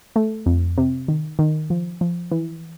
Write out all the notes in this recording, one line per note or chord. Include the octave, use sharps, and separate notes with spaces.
A3
F2
C3
D#3
D#3
F3
F3
E3